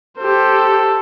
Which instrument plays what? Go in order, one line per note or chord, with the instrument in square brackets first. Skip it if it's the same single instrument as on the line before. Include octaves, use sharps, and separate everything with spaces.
[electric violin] G4 C5 [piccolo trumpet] A4